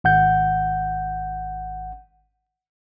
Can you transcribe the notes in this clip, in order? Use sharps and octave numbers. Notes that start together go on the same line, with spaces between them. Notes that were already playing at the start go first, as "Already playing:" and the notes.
G#1 F#5 G6